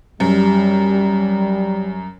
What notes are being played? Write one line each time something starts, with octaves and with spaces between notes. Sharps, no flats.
F#2 G3